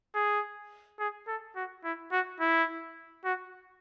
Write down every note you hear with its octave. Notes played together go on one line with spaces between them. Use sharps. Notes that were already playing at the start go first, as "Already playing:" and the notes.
G#4
G#4
A4
F#4
E4
F#4
E4
F#4